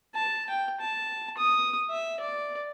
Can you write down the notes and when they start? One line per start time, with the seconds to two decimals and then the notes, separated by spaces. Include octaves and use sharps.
0.15 A5
0.50 G5
0.80 A5
1.38 D#6
1.90 E5
2.20 D5